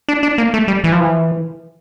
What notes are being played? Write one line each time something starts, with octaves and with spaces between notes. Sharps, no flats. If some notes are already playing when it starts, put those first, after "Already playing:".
D4
D4
A#3
A3
G3
E3
F3
E3